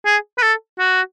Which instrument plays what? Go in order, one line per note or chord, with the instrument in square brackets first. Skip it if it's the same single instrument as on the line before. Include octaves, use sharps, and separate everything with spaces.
[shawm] G#4
B4
A4
F#4